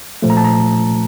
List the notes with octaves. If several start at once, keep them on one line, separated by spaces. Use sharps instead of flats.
A#2 F3 A3
A#5
A5
A#5